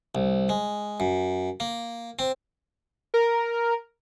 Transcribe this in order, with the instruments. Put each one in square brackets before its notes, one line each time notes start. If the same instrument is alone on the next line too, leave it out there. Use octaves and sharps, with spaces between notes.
[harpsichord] C2
G#3
F#2
A#3
C4
[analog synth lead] A#4